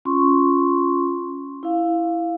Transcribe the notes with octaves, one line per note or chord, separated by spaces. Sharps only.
C#4 F4 C6 C#6
E4 F5